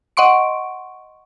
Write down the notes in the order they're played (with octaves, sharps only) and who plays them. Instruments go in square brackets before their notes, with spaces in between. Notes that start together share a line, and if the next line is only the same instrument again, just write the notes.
[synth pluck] D#5 F#5 C6 C#6 D7